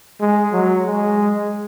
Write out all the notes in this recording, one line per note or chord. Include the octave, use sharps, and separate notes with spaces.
G#3
F#3
G#3